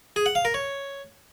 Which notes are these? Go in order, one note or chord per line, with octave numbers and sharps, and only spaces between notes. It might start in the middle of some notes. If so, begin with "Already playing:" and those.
G#4
F#5
F5
A#4
C#5